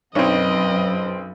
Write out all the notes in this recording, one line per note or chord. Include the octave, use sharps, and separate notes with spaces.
B1 F#2 C4 D4 D#4 B4 C#5 D#5